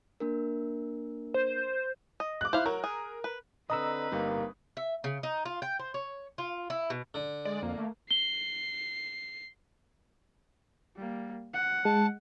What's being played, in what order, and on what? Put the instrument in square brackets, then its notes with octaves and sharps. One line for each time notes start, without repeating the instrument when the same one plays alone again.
[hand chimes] A#3 D4 A#4
[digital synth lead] C5
[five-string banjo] D#5
[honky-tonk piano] D6 F#6
[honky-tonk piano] E4 [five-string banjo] C5 F5
[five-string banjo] F#3 [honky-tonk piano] A#4
[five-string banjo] G#4
B4
[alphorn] D3 [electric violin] C4 B4 [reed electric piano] D#5 A#5 E6 [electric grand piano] D#6
[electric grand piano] G1 G3 D#4 [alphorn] A#3
[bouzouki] E5
C#3
D#4
F4
G5
C5
C#5
F4
E4
B2
[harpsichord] D3
[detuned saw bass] G#3 [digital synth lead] D5
[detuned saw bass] F2 [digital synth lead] A#3
[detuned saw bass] A3
[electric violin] C7 [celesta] G7
[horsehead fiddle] G3 A#3
F#5
[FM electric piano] G#3 [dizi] A5